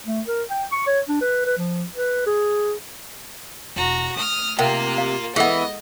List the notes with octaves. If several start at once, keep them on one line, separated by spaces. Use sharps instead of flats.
A3
A#4
G5
C#6
C#5
D4
B4
B4
F3
B4
G#4
E1 F#4 A#5
A3 D#6 F6
C3 A#3 F4 A#4 F#5 G5
F5
E3 G#3 B3 E4 G#4 A4 D#5 F#5